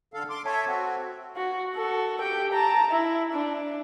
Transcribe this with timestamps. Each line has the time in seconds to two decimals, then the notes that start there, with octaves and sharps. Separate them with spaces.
0.14 D3 A4 F5
0.30 C6 D6
0.46 A4 C#5 E5 A5
0.67 C4 F#4
1.36 F#4
1.74 F#4 A4
2.21 G4 G5
2.52 A5 A#5
2.90 E4
3.32 D4